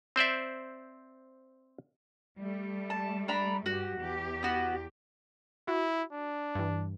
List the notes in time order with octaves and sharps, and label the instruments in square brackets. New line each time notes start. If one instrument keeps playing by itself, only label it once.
[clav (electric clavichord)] C4 C5 D5 E5
[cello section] G3 A3
[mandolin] A5
D4 A#5 B5
[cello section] G2 G4 [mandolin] F#4
[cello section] E2 G4
[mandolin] B3 F#4
[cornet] E4 [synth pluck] F#4
[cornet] D4
[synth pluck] G2 E3